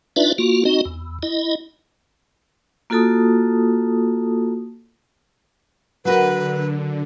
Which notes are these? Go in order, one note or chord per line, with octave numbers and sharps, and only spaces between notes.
D4 D#4 F4 B4 D5 E5
A#3 F4 F#4
C4 D#4 F#4 D#5
E2
E4 D#5
A#3 F4 F#4 A4 A5 D#6
D3 F#3 F#4 A#4 B4